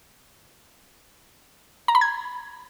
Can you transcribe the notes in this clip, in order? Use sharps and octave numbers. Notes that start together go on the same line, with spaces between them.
A#5
B5
G#6